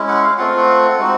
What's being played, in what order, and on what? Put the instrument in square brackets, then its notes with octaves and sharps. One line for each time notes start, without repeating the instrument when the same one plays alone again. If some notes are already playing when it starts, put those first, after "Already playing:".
Already playing: [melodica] G#3 C#4 E4
F#5
F5
A3 C4 F4 F#5
F5
F#5
G#3 C4 D#4 F#4